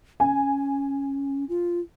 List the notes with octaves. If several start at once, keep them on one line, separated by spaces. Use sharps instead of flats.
C#4 G#5
F4